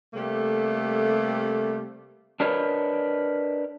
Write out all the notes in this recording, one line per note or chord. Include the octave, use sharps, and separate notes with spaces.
C3 G3 A3 A#3 G4 A4
D4 A#4 B4 C#5 D#5